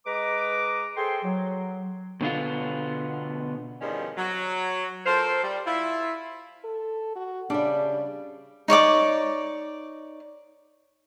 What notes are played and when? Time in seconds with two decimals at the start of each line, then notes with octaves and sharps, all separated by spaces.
0.06 G#3 B4 D#5 A#5 D6
0.96 G#4 A4 C5 G5 C6
1.24 F#3
2.21 B2 D3 B3 F4
3.81 E2 G2 D#3 F3 G3 C#4
4.18 F#3
5.06 F4 A4 A#4 C5
5.44 G3
5.67 E4 F4
6.65 A4
7.16 F#4
7.50 C#3 G3 D4 E5
8.68 D#4 C#5 D5 D6